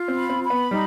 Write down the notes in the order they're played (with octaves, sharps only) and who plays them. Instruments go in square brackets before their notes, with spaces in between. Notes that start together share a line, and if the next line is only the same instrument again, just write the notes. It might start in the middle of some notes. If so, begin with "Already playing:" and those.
Already playing: [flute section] F4
[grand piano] C4
[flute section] B5
[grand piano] C4
[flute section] B5
[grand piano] B3
[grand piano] G3 [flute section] D#4